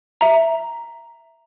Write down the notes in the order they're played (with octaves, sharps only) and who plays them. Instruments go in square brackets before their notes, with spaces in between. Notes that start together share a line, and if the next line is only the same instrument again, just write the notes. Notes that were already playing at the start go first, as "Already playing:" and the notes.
[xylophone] E5 A#5